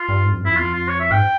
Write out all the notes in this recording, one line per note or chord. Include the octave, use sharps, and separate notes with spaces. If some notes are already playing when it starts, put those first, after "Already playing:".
Already playing: F4
G2
G#2
F2
G2
F2 E4
E2 F4
F2
F4
C#5
E5
G#2 G5